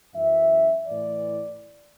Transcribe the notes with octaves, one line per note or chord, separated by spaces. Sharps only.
F#2 E3 E5
A2 E3 D5